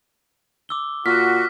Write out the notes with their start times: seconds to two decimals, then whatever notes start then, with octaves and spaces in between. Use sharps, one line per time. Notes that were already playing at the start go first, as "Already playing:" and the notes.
0.69 D6 E6 G7
1.06 A#2 F#4 F6 B6